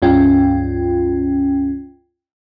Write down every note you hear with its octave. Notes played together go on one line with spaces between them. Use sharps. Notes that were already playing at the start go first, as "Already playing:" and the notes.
C#2 G2 C#4 F4 G5